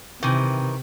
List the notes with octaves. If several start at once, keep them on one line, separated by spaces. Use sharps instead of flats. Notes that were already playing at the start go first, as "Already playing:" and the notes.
C3 D#3 E3